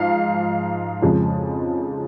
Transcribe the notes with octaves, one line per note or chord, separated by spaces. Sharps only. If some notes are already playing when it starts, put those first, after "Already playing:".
Already playing: G#2 F3 F5
F2 C#3 F3 G#3